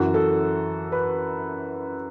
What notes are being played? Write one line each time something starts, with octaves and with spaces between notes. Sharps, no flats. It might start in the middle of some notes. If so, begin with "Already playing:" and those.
Already playing: F#2 E3 F#4
A4
B4